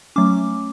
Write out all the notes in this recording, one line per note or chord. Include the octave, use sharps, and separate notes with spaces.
F#3 A3 C#4 D6